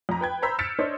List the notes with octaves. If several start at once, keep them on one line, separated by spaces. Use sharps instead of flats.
F2 A#5
B4 G5 G#6
C5 A#5 B5 E6 G6 B6
F6 A6 B6 C#7 D7 E7
D4 C5 C#5 D#5